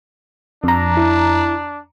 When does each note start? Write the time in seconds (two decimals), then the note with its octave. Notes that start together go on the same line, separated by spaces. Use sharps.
0.64 F2 D4 A#5
0.97 E4